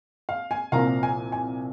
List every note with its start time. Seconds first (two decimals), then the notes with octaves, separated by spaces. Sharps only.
0.29 F5
0.51 G#5
0.72 C2 A#2 F3 F5 A#5
1.03 G#5
1.32 G#5